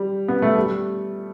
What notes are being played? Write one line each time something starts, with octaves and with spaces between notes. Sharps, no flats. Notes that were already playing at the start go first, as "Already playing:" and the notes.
Already playing: G3
B3
A3
G3